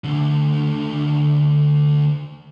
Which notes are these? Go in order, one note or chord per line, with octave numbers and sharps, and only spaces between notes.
D2 D3